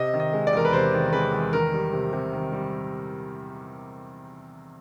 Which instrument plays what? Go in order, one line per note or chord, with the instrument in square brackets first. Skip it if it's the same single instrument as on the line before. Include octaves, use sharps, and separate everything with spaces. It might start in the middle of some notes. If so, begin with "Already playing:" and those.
Already playing: [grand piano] C3 D#5
D#3
D#5
G#3
D5
E2 A#4
B4
C3 C5
D#3
G#3 B4
E2
D#3 A#4
G3
C3
C3
D#3
G3